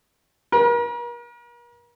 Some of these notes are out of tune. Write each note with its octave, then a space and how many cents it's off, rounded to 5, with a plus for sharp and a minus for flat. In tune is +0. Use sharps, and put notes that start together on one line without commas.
A#4 +40